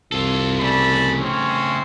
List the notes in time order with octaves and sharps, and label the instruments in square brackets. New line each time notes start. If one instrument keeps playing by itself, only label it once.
[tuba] C2 [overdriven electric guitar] F4 A4
[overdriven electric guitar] C#3 A3 [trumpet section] D5 A5 B5
[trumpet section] C4 C#4 C#5